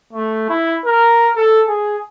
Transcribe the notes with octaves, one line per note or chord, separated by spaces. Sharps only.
A3
E4
A#4
A4
G#4